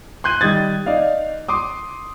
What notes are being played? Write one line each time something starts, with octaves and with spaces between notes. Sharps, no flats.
C6 F#6 G6 D#7
D#3 G3 D#6 G#6 A6
D#4 D5 D#5 F5
C6 D6 D#6